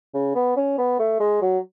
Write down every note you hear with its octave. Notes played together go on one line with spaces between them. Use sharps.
C#3
B3
C#4
B3
A3
G#3
F#3